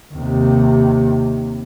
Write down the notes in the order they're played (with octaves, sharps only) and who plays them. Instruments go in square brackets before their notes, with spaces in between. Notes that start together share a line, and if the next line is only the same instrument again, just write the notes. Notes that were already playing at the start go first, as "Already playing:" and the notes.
[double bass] D#2 C3